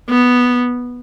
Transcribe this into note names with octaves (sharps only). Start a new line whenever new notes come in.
B3